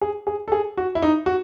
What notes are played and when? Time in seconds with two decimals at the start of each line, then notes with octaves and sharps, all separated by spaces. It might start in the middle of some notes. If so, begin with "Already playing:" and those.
0.01 G#4
0.27 G#4
0.48 A4
0.52 G#4
0.77 F#4
0.95 E4
1.02 D#4
1.26 F#4